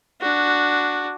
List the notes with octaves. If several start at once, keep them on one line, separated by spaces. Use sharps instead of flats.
D4 F#4